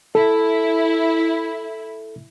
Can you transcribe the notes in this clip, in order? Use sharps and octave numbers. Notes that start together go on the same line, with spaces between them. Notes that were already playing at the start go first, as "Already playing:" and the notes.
E4 A4